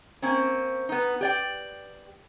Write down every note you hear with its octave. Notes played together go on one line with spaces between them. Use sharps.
A#3 C4 C#4
B3 D#4
G4 D5 G5